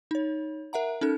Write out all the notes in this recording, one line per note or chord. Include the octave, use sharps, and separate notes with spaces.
D#4 C#5
A#4 E5 F#5 A#5
C#4 D#4 A4 F#6